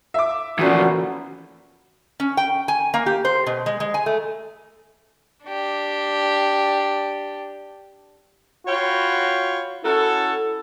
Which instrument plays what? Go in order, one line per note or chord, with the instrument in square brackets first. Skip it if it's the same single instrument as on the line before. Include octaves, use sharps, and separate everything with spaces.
[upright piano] E5 D6
[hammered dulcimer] A#2 A3 B3 [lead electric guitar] E3 F3 [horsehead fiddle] C#4 F#4
[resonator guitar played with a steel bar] C#4
G5
G#5
A#3
G4
C5
B2
G#3
G#3
G#5
A3
[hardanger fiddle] D4 G4
[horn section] F4 F#4 C#5 G5 B5
C#4 E4 F#4 A4